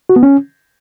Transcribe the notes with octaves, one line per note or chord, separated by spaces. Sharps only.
F#4
B3
C#4